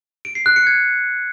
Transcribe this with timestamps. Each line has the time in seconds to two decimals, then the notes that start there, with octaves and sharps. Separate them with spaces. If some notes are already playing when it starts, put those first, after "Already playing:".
0.25 D7
0.35 C7
0.46 F#6
0.56 C#7
0.67 G#6